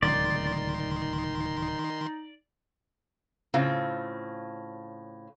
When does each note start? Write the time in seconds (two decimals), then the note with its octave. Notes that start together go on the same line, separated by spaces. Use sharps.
0.02 D1 C#2 D#3 D#4 D5 C6
3.54 A2 C#3 C4 F4